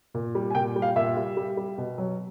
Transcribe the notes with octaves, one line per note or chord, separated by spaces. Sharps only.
A#2
G3
G#5
A#2 G5
G3
F5
A#2 E5
G3
G3
G3
B2
F#3